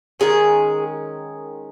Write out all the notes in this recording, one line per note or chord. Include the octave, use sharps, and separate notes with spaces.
D#3 G#3 C#4 G#4